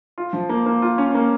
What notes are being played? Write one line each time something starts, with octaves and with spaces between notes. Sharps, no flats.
F4
F3
A#3
A#3
F4
C#4
A#3